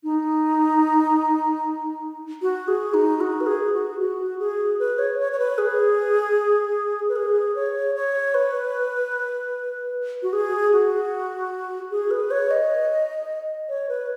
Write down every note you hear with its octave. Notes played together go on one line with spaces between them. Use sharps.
D#4
F#4
G#4
D#4
F#4
B4
G#4
F#4
F#4
G#4
B4
C#5
C#5
C#5
B4
G#4
B4
G#4
C#5
C#5
B4
F#4
G#4
F#4
G#4
B4
C#5
D#5
C#5
B4